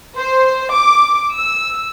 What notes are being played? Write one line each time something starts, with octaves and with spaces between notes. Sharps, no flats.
C5
D6
E6